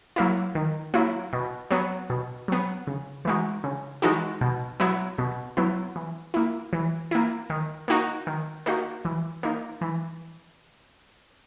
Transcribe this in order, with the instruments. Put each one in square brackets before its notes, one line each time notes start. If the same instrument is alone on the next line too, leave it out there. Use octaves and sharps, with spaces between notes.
[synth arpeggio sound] F#3 A#3 E4
D#3
F#3 A#3 E4
B2
F#3 B3
B2
F#3 B3
C#3
E3 G#3 D#4 F#4
C#3
E3 G#3 D#4 F#4
B2
F#3 B3 E4
B2
F#3 B3 E4
E3
A#3 E4
E3
A#3 E4
D#3
A#3 D#4 F#4
D#3
A#3 D#4 F#4
E3
A#3 D#4
E3